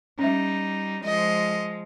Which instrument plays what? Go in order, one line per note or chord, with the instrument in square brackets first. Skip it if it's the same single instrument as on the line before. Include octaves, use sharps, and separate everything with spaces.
[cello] G3 D#4 [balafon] C#4 E5
[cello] F3 G#3 [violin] D#5